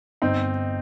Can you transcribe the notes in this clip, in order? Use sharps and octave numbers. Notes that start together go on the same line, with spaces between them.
G1 C4 D#4